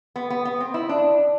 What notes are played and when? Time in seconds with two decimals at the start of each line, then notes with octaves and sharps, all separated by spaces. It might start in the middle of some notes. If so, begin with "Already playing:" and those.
0.16 B3
0.30 B3
0.45 B3
0.60 C4
0.74 E4
0.89 D4